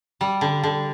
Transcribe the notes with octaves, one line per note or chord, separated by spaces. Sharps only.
G3
D3
D3